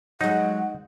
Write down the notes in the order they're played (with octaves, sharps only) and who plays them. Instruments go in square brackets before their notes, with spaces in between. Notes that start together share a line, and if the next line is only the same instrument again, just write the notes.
[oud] F#3 G#3 [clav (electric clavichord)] D#4 [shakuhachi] F#5